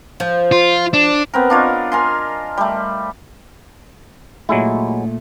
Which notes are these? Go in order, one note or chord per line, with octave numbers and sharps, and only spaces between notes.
F3
F4
D4
B3 C4 A#4
D4 F4 C#5 D#5
A#4 G#5 C6
G3 A3
A#2 F#3 G#3 A3 E4